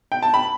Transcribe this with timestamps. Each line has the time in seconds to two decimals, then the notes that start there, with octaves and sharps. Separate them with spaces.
0.12 G5
0.22 A5
0.34 B5